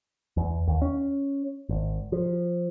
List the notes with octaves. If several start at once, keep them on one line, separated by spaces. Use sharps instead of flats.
E2
D#2
C#4
G#1
F3